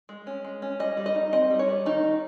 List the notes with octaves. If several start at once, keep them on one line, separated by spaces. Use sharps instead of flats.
G#3
C#4
G#3
C#4
G3 D#5
G3
D#5
D#4
C4 D#5
G3
C#5
G3
D#3 D#4
D#3